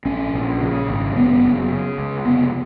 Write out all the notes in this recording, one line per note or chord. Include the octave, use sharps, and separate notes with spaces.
A#1 C#4
A#1
C#3
G#1
F#1 B3
F#1
C#3
C#2
F1 B3